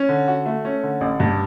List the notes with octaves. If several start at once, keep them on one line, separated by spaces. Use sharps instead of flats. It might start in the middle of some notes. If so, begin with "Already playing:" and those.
Already playing: C#4
D3
F#4
A3
C#4
D3
A1
G2